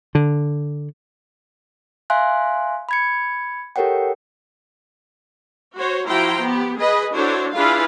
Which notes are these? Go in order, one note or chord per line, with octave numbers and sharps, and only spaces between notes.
D3
E5 F5 G#5 C6 F#6
B5 G#6 C#7
G4 A4 A#4 C#5 F#5 G5
F#4 C5 C#5
F3 E4 F#4 G5 A#5 C6
B3 G4
G#4 B4 D#5
D4 E4 F#4 A4 C5 C#5
D4 E4 F4 G#4 B4 F5